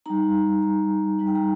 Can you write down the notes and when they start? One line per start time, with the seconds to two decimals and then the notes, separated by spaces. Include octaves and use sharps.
0.06 G3 D#4 A#5
0.62 A#5
1.19 G3 D#4 A#5
1.27 G5
1.35 A#5